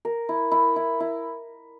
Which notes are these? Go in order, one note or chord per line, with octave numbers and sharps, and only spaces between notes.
A#4
E4
E4
E4
E4